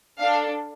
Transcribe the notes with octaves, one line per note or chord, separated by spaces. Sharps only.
D4 A4 F5